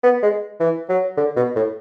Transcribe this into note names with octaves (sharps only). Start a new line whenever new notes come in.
B3
G#3
E3
F#3
D3
B2
A2